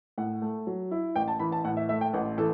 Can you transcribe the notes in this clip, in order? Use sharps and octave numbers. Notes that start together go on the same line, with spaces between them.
A2 F#5
A3
F#3
E4
A1 G5
A5
E3 B5
A5
A2 F#5
E5
A3 E5
G5
A1 F#5
E3 A4